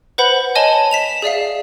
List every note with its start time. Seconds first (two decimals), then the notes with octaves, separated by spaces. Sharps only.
0.18 B4 C5 F#5 B5
0.55 C#5 D#5 G#5 A5 E7 G7
0.91 B6 E7 F7
1.22 G#4 D5 E5 F5